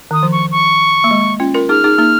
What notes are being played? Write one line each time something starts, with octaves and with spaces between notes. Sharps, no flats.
D#3 D#6
F3
C#6
C#6
A#3
G#3
C#4 F4
F4 A#4
D#4 G#4 F6
D#4 G#4
A#3 D#4